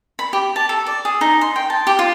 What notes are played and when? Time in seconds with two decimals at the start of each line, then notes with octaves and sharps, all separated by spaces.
0.19 B5
0.33 G4
0.56 A5
0.69 A4
0.86 D5
1.05 G#4
1.21 D#4
1.41 C6
1.56 G5
1.70 A5
1.87 G4
1.99 F4